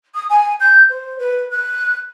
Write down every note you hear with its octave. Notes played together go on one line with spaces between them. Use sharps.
D#6
G#5
G6
C5
B4
F#6